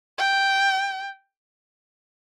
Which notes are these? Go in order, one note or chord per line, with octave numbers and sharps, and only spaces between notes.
G5